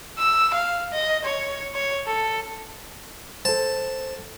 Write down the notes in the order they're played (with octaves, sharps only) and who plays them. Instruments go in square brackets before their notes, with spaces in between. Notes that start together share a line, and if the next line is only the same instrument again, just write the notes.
[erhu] E6
F5
D#5
C#5
C#5
A4
[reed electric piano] A4 C5 [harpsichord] A5